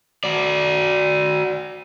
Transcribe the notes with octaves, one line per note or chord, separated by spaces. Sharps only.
F#4 D5